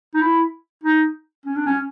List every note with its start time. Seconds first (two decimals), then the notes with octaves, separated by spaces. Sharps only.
0.14 D#4
0.21 E4
0.84 D#4
1.46 C#4
1.56 D4
1.66 C#4